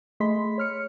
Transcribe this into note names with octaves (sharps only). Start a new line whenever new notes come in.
A3 G#4 D#5 B5 C6 B6
C#5 F6 C#7